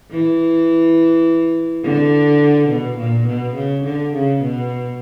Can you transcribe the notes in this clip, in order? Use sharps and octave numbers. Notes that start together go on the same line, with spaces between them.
E3
D3
B2
A#2
B2
C#3
D3
C#3
B2